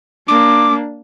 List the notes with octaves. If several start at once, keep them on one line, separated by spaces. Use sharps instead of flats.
A#3 D4 D6